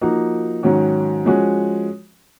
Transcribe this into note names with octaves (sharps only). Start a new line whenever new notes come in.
F3 A#3 D#4 F#4
G#2 D#3 F#3 C#4 F#4
F3 G#3 C#4 F#4